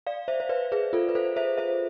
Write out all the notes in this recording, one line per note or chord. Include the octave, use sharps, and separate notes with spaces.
D5 F5
C5 E5
C5
B4 D5
G#4 B4
F4 A4
B4
A4 C5
C5 E5
C5 E5